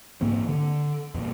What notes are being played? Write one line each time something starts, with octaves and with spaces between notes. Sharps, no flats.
G#2 E3 A#3 C4
D3
E2 A#2